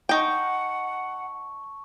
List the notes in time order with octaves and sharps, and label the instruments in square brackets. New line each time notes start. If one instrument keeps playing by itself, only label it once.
[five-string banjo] D#4 G5 [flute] F#5 [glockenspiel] A5 C#6